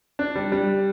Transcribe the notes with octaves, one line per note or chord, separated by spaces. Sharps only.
D4
G3
G3